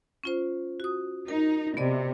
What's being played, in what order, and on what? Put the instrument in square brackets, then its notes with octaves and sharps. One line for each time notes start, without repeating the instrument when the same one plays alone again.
[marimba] C#4 F4 C5
F#4 D#6
[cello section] D#4 [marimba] A#4
[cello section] C3 [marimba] B3 D5 D#5